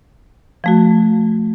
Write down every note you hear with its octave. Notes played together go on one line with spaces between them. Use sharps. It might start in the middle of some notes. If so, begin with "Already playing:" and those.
F3 A3 F#4